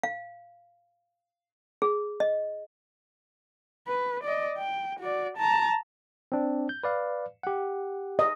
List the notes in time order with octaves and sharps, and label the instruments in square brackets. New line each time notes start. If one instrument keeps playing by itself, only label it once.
[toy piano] F5
G#4
D#5
[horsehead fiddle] B4
D5 D#5
G5
F#4 D5
A5 A#5
[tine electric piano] C4 D4
G6
B4 D5 F5
G4 F#5
[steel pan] D#5